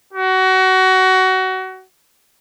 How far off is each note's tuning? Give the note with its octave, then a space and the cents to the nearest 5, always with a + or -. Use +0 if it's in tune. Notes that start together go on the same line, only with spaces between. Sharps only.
F#4 +25